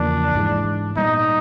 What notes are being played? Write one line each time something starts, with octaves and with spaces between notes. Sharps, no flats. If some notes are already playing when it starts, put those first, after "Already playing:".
Already playing: E2 C#3 F3 A#3 D4
G#2 E3 G#3
A#2 G3 B3 D#4